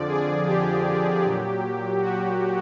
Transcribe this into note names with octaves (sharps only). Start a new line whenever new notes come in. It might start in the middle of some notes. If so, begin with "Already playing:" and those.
Already playing: F2 D3 F3 D5
G#4
G4
A#2 F#3
F#4